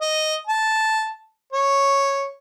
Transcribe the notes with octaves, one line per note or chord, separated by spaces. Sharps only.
D#5
A5
C#5